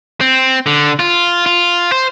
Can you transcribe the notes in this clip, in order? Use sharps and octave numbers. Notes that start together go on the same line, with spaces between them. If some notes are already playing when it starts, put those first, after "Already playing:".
C4
D3
F4
F4
C5